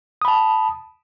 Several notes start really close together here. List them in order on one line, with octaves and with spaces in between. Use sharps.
D#6 B5 A5